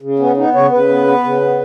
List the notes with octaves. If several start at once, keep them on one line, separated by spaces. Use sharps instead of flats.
C#3
B3 C#4
B3 D#4
C#3 C#5
C#3 B4
B3
B3
C#3
B3